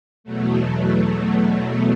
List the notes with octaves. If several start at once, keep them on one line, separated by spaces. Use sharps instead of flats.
E2 B2 F#3 A3